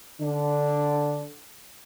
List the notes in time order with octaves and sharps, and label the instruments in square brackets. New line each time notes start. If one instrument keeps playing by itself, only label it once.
[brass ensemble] D3 D4